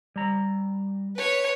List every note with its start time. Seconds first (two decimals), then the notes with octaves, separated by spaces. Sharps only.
0.16 G3 A#5
1.16 B4 C#5